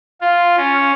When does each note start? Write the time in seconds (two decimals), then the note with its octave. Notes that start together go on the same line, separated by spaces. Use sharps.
0.21 F4
0.57 C#4